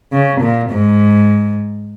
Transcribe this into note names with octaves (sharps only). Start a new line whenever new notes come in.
C#3
A#2
G#2